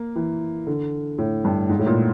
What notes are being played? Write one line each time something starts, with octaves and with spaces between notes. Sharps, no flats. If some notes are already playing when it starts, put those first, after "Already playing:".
Already playing: A#3
E3
D3
A2
G2
G#2
A2
A#2